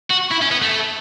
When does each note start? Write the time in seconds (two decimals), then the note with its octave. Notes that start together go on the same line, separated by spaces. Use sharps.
0.10 F#4
0.31 E4
0.42 C#4
0.51 B3
0.62 A3